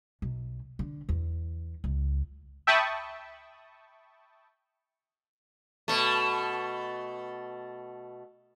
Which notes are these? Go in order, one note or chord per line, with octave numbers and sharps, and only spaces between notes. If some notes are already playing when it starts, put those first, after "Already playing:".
B1
D3
E2
C#2
E5 G5 A5 B5 C#6 D#6
B2 A3